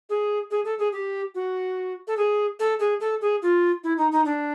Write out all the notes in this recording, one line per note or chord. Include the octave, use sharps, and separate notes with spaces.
G#4
G#4
A4
G#4
G4
F#4
A4
G#4
A4
G#4
A4
G#4
F4
E4
D#4
D#4
D4